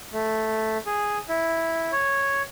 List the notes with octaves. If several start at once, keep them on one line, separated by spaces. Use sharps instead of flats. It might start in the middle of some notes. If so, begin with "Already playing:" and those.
A3
G#4
E4
C#5